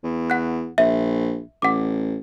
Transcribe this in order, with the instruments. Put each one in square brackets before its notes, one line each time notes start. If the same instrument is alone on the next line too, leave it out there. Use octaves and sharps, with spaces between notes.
[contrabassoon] E2
[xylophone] F#5 F#6
[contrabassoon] A#1 [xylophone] E5
[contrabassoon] A1 [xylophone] F#5 D6